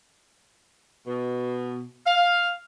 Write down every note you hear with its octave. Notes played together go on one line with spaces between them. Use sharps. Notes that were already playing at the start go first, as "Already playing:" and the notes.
B2
F5